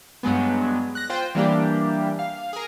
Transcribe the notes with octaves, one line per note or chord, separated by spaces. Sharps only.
G2 F#3 G#3 B3
F#6 A#6
F4 C5 G5
E3 G3 A#3 D4 G4
F5
G#4 A#4